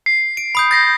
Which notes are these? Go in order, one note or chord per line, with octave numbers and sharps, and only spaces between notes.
C7
D7
B5 D#6 G6
G6 A6 A#6 C7